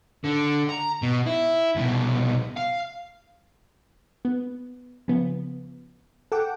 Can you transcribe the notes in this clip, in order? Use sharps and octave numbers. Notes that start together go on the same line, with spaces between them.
D3
A#5
B2
E4
C2 B2
F5
B3
C#3 F3 B3
A4 F#5 G5 D6